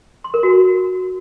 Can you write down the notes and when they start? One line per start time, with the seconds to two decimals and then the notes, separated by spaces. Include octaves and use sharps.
0.24 C6
0.34 A#4
0.43 F#4